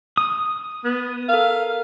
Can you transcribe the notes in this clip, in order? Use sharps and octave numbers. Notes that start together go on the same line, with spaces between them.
D#6
B3
A4 A#4 F5